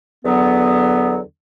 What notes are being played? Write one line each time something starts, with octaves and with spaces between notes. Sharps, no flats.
E2 D3 F#3 B3